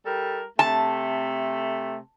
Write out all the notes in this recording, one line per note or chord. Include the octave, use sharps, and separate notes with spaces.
G3 A4 A#4
C3 A3 A5